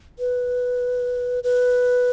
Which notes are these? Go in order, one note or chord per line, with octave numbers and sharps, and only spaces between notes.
B4
B4